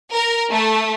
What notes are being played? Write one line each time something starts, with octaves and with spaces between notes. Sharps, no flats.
A#4
A3